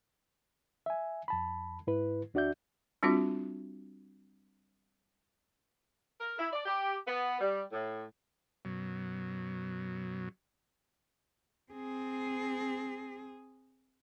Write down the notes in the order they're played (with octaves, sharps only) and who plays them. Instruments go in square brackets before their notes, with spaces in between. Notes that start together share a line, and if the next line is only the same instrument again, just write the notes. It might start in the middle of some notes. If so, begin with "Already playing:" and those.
[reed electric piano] E5 G#5
F2 A5 B5
G#2 E4 B4
D2 D4 F#4 D5 E5 G6
[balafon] G3 C4 D4 F4 F#4
[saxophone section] A#4
E4
D5
G4
B3
G3
A2
[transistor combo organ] F#2 B2 F#3
[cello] C4 G#4